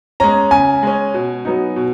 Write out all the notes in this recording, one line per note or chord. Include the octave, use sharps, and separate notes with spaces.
G#3 C#4 A#5
C#3 G#5
G#3 C#4
B2
F#3 B3 D#4
B2